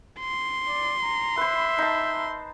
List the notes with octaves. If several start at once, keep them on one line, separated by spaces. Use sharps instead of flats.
C6
D5
A#5
B4 C5 E5
D#4 A5